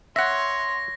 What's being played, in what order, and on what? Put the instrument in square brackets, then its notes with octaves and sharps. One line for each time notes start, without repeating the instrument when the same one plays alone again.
[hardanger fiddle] C#5 [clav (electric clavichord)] E5 F#5 [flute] C6 [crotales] A#6